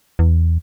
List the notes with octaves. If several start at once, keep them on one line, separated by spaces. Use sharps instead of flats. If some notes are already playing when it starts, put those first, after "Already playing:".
E2